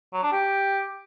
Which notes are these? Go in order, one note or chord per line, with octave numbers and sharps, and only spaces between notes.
F#3
D4
G4